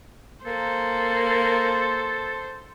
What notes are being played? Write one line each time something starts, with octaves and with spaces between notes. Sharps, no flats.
A#3 A4 C5